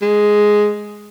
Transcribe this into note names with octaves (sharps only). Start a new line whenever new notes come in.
G#3